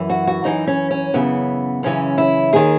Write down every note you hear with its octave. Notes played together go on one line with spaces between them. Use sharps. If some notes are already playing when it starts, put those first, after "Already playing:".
Already playing: F#2 E3
F#4
F#4
F#2 E3 D#4
C#4
C#4
F#2 C#3 E3 B3
F#2 C#3 E3 C#4
E4
D#2 D#3 G#4